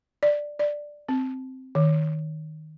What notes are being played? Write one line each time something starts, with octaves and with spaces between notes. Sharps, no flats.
D5
D5
C4
D#3